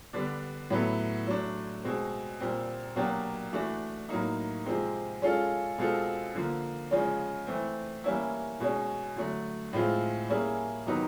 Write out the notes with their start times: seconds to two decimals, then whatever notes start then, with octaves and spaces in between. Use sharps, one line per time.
0.13 D3 G3 B3 D4
0.70 A2 F#3 B3 E4 A4
1.27 F#3 A3 D4
1.83 B2 G#3 C4
2.40 A#2 G3 C4
2.96 B2 F#3 A#3 D4 G4
3.53 E3 A3 D4 F#4
4.09 A2 F#3 A#3 D#4
4.66 C3 F3 G#3 C4
5.22 G#3 C#4 F4 A4
5.78 B2 G#3 C4 F4 A4
6.35 D3 F3 A#3
6.91 C#3 F3 G#3 C#4
7.47 E3 A3 C4
8.04 E3 G3 A#3 C#4 E4
8.60 B2 G#3 C#4
9.16 D3 F#3 A3
9.73 A2 F3 G#3 C4 F4
10.29 G3 A#3 C#4 E4 G#4
10.86 C3 D#3 F#3 B3 D#4